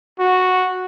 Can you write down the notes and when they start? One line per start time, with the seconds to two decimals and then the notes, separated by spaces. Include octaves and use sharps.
0.19 F#4